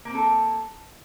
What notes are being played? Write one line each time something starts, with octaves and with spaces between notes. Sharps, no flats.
A#3 C4 A4